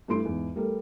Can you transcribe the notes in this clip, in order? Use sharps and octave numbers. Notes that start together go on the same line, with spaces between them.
G2 A3 E4 C6 D7
E2 G#2
G3 A3 A4 A#4